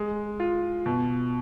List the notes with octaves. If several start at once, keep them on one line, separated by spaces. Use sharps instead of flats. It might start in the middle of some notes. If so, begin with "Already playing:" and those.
Already playing: G#3
F4
B2